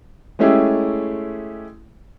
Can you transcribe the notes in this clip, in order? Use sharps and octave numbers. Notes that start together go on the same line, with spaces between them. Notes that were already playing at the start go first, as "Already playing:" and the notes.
G#3 A3 C#4 E4 G4 G#4